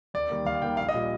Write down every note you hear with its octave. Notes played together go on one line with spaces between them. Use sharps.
D#2 D5
D#3 G3 A#3
D#2 F5
D#3 G3 A#3 G5
A#1 F5
D#5
A#2 G3